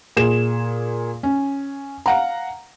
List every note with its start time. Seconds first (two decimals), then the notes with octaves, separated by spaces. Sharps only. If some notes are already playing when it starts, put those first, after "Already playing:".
0.17 A#2 G#4 E7
1.23 C#4
2.06 F5 F#5 A#5